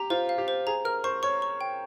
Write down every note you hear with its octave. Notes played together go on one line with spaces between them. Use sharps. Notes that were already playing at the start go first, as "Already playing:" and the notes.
Already playing: G4 A#5
F4 C5
F5
G4
C5
G#4 A#5
A#4 F6
C5 C#6
C#5 C#6
C#6
G5